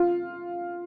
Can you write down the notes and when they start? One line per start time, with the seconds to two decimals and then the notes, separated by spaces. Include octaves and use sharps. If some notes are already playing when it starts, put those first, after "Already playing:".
Already playing: F4